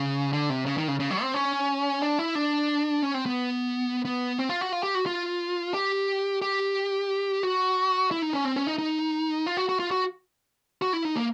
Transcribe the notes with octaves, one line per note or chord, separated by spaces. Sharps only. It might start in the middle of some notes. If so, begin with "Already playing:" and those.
Already playing: C#3
D3
C3
C#3
D#3
C#3
C#3
F#3
C4
C#4
D4
E4
D4
C#4
C4
B3
B3
C4
F4
F#4
F4
G4
F#4
F4
G4
G4
F#4
E4
D#4
C#4
C4
C#4
D#4
D#4
F4
F#4
F#4
F4
F#4
F#4
E4
D#4
A#3